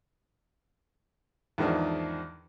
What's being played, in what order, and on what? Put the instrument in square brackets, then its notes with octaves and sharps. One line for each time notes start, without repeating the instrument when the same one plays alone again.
[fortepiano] E2 G#2 D#3 F3 D4